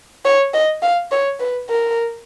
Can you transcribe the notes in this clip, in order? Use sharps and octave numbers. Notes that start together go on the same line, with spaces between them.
C#5
D#5
F5
C#5
B4
A#4